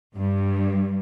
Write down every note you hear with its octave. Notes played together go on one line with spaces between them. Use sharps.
G2